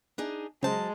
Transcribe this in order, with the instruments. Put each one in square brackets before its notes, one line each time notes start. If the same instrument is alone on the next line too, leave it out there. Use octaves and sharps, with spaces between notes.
[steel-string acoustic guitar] D4 D#4 G#4
[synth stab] C#3 C5 [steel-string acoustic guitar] F#3 A5 [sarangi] G#3